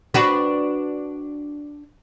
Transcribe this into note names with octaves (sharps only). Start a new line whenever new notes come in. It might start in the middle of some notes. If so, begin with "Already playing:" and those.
D4 F#4 B4